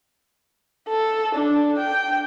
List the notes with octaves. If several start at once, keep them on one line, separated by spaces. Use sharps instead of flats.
A4
D4
G5